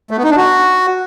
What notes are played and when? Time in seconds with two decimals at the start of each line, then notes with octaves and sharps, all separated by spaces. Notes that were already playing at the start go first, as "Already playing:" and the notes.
0.11 A3
0.17 B3
0.24 D#4
0.30 D4
0.37 F#4